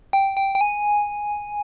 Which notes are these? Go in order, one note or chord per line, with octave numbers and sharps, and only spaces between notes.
G5
G5
G5
G#5